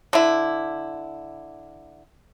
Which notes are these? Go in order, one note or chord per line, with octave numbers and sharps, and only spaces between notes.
D3 E4